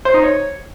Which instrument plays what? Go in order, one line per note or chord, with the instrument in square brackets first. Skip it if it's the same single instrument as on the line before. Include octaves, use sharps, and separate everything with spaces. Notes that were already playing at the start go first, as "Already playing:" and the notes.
[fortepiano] C5
D#4
C#5